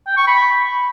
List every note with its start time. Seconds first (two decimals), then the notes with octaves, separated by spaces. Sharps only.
0.07 G5
0.17 C#6
0.27 B5